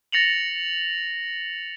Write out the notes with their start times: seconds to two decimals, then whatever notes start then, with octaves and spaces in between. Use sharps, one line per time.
0.12 A6 A#6 C#7 F7 F#7